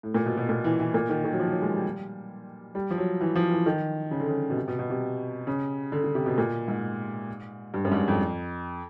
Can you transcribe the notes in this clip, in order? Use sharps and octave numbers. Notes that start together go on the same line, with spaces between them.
A2
A#2
B2
B2
A#2
E3
E3
A#2
D#3
D#3
F#3
F3
F#3
G#3
G3
G3
F3
F#3
E3
F3
E3
D#3
C#3
D3
C#3
B2
C3
B2
B2
C3
C#3
D3
D3
C3
B2
A#2
G#2
G2
F#2
G#2
G2
F2